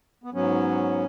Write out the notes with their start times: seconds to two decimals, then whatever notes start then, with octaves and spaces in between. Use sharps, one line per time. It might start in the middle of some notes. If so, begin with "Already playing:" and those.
0.24 B3
0.34 G#2 F#3 B3 C#4